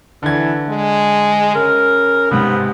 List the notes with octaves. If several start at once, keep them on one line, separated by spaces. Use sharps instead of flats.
D3 E3 G#6
G#3
C#3 A#4
G#2 C3 B3